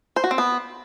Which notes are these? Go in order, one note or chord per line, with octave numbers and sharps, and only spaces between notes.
C5
F#4
C4
B3